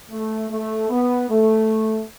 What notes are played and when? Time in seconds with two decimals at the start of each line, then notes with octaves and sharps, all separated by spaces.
0.10 A3
0.50 A3
0.89 B3
1.30 A3